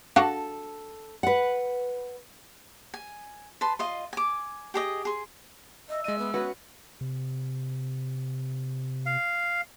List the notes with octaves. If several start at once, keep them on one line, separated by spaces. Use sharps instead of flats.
D4 F#4 A4 F5
B4 F#5
G#5
B4 A5 C6
F4 D#5 C6
G#5 D6
G4 G#4 D#5
G#4 C6
D#5 E5
G#3 D#5 D#7
B3
B3 C#4 F#4 B4
C3
F5